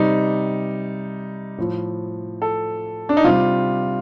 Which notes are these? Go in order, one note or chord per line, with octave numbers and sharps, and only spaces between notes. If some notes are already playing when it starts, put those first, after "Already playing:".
Already playing: C3 G3 D#4
A2 F3
A4
D4
D#4
C3 G3 F4